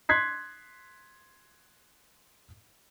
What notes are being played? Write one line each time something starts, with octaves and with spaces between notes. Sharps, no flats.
C6 F#6 G#6 B6 C7